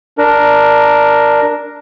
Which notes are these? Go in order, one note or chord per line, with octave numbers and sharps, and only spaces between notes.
D4 A#4